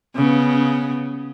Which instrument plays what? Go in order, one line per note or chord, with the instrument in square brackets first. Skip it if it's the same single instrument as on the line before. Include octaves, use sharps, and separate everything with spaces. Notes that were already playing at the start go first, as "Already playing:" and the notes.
[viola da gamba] C#3 B3